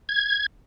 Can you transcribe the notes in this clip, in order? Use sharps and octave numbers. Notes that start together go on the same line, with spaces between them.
G#6